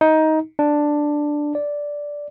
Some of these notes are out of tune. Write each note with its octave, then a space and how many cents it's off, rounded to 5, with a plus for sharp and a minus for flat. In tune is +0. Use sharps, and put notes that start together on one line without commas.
D#4 +15
D4 +5
D5 -5